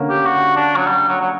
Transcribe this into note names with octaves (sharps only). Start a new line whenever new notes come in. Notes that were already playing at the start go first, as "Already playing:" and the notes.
Already playing: D3 A#3 C#4
G4
F#4
D4
F#3
G3
F#3
F#3